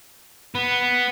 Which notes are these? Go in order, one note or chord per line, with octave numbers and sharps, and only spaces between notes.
B3